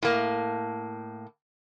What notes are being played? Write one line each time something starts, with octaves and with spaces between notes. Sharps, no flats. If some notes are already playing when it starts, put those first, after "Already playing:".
A2 A#3